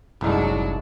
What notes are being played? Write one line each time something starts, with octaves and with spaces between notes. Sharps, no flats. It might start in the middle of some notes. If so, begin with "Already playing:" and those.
F#1 C2 A2 F#3 G#3 D4 D#4